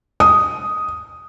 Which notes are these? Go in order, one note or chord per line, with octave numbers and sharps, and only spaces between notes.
D#6